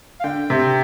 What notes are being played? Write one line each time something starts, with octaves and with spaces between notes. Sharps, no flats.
F5
D3 G5
C3